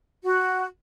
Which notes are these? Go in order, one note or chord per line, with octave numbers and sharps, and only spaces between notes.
F#4